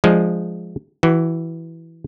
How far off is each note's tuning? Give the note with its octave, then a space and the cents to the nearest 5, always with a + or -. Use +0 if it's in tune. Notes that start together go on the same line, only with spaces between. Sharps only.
F3 +0 G#3 +0 D4 +25
E3 +0 F#4 +30